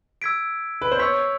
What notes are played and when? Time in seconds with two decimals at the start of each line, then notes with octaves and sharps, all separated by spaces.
0.22 E6 G#6 B6 D7
0.82 B4
0.92 C5
0.99 C#5 E6 G6 B6